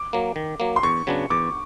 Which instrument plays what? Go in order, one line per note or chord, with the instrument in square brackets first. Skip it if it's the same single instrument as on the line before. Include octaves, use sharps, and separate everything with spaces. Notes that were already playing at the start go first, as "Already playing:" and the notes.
Already playing: [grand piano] D6
[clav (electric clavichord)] F#3 A#3
D#3
F#3 A#3
[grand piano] C6
[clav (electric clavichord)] E2 [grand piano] C#6
[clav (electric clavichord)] C#3 F#3 B3 D4
[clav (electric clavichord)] E2 [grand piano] D6